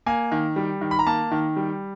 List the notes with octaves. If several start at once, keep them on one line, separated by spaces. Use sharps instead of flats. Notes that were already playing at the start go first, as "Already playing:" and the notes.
A#3 G#5
D#3
G3
D#3
B5
A#5
A#3 A5
D#3
G3